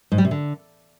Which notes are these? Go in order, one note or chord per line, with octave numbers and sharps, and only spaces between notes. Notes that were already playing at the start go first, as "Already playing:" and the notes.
G#2
G3
C3
D3